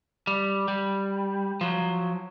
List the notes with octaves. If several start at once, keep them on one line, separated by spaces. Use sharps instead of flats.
G3
G3
F3 F#3